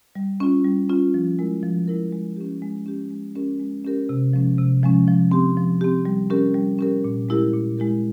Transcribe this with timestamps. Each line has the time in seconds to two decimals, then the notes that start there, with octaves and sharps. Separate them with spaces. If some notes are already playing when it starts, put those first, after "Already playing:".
0.15 G3
0.40 C#4 F4
0.65 G3
0.89 C#4 F4
1.14 F3
1.39 G#3 E4 A#4
1.63 F3
1.88 G#3 E4 A#4
2.12 G#3
2.36 C#4 G4
2.62 G#3
2.86 C#4 G4
3.11 G#3
3.35 C#4 G4 A#4
3.60 G#3
3.85 C#4 G4 A#4
4.09 C3
4.33 F3 G#3 C#4
4.58 C3
4.83 F3 G#3 C#4
5.08 F3
5.31 C4 G4
5.57 F3
5.81 C4 G4
6.05 G3
6.30 C#4 G4 A#4
6.54 G3
6.79 C#4 G4 A#4
7.04 A#2
7.29 G#3 E4 G4 A#4
7.53 A#2
7.78 G#3 E4 G4 A#4